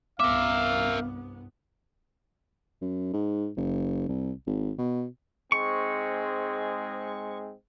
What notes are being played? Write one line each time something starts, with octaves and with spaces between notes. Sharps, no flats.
C2 G2 B3 A#4 E5 F5 D6
F#2
G#2
F#1
C2
G#1
B2
G#2 G#3 C4 C#6